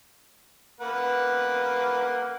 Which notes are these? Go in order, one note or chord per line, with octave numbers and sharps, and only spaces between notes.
A#3 B4 F#5